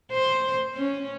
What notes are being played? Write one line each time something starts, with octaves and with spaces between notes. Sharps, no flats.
C5
C#4